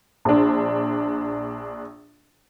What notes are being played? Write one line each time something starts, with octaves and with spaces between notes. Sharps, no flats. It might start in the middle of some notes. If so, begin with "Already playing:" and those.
A#1 D4